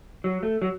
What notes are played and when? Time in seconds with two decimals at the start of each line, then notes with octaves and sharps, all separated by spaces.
0.24 F#3
0.43 A3
0.62 F#3